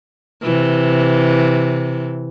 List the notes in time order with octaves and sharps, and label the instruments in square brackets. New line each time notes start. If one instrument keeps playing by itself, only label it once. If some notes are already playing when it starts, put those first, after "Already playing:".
[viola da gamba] C3 E3